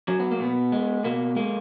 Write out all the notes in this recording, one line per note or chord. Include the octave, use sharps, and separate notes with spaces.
F#3 C#4
B3
A#3
B2 B3
G#3
B2 A#3
G#3 A#3